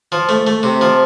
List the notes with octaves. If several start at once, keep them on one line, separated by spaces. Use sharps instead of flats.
F3
A3
A3
C3
F3